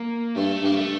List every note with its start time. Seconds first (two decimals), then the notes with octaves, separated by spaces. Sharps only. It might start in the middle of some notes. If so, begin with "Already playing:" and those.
Already playing: A#3
0.36 G2 A3
0.63 G2 A#3
0.76 A3